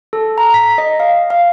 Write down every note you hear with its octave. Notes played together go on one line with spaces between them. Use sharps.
A4
A#5
B6
D#5
F5
F5